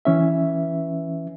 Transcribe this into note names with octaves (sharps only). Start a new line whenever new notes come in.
E3 C#4 E5